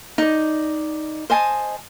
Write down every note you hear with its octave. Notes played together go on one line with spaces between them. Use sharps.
D#4 D5
C5 D#5 G#5 A5